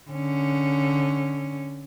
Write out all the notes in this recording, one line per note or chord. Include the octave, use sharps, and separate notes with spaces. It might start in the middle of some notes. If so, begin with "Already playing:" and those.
D3 C#4